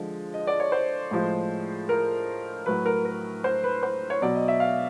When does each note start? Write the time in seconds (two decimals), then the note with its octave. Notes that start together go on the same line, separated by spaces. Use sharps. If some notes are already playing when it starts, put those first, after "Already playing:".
Already playing: D3 F3 G#3
0.34 D#5
0.47 D5
0.60 C#5
0.72 C5
1.11 A2 F3 G#3
1.89 A#4
2.66 A2 F#3 B4
2.86 A#4
3.05 A#4
3.44 C5
3.64 B4
3.83 C5
4.10 C#5
4.22 B2 F#3 D5
4.35 D#5
4.48 E5
4.60 F5